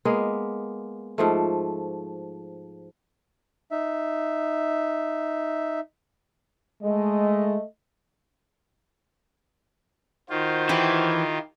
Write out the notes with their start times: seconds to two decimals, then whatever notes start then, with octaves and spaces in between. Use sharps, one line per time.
0.05 G#3 A#3 B3
1.18 G#2 F3 A3
3.70 D#4 E5
6.83 G#3 A3 D#5
10.30 D#3 F4 F#4 C5
10.69 E3 E4 G4 G5